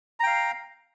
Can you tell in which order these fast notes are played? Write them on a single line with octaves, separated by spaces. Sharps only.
A#5 G5 F5